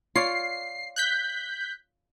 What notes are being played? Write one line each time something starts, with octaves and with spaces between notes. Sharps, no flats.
F4 C#5 D5 C7
F#6 G6 B6